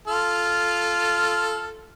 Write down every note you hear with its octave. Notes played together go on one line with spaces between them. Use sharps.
F4 A4 F6